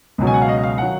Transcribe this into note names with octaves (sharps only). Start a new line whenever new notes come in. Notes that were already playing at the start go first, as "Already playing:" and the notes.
C#2 B2 F#3
G#5
F#5
F5
D#5
F5
D#3 F#3 F#5